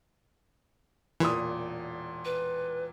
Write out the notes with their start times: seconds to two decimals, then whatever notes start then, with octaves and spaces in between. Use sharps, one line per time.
1.20 E1 A#2 E3 D#6
2.25 B4